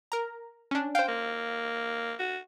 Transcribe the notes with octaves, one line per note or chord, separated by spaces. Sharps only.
A#4 A#5
C#4 D4
C5 F5 G5
A#3
F#4